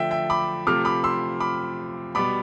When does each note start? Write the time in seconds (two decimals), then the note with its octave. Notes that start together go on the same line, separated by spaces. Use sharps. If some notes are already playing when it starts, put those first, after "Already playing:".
Already playing: D3 F3 A3 E5 G5
0.11 E5 G5
0.30 B5 D6
0.67 C3 F3 A3 D6 F6
0.85 B5 D6
1.04 C6 E6
1.40 B5 D6
2.15 B2 G3 B3 B5 D6